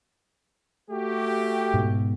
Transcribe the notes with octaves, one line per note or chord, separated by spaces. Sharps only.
A3 F#4 G4
G#2 B2